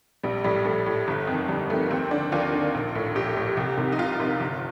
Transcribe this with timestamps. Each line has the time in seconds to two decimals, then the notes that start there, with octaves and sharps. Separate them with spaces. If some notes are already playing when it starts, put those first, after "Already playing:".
0.23 A#1 G3
0.44 A2 G3
0.65 A#1 A3
0.86 A2
1.08 G1
1.27 F2 D#3
1.48 G1 G3
1.70 F2 D#3 A3
1.86 A#3
1.91 D#2 C4
2.11 D3 D4
2.32 D#2 F4
2.52 D3
2.74 A#1
2.95 A2
3.15 A#1 G4
3.36 A2
3.57 C2
3.78 C3 D#3
3.92 D#4
3.98 C2 F4
4.20 C3 D#3
4.40 G1